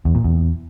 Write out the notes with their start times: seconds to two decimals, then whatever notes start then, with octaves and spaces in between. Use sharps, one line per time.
0.05 E2
0.15 A#2
0.24 E2